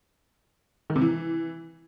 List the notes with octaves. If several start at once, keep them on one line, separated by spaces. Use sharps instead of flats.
D#3
C3
E3